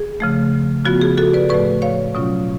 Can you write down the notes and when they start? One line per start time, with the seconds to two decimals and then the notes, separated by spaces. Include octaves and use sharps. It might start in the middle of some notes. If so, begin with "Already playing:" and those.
Already playing: G#4
0.20 C#3 F3 A3
0.85 C#3 F3 B3 F4 F#4
1.01 G#4
1.17 F#4 A4
1.33 B4 D5
1.49 A2 F3 A3 B4 D5
1.82 C#5 F5
2.15 B2 F#3 C#4 F4